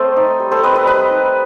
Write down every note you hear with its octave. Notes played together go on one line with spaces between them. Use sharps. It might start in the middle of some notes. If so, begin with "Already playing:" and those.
Already playing: A3 C4 A4 C5 D#5
D#4
G3
A4 C5
C4 B4 D#5
B4 D#5
G3 B4 D#5
D#4